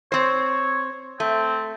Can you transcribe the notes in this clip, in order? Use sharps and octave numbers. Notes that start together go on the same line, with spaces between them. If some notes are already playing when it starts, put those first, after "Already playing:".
C4 C5 C#5
A3 C4